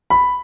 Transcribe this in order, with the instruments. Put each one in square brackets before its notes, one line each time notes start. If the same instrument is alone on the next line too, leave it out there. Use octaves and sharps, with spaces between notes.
[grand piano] B5